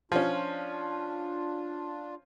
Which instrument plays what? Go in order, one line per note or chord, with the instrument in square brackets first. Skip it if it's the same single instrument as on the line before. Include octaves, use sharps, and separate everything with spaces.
[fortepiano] F3 C#4 [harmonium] D4 F4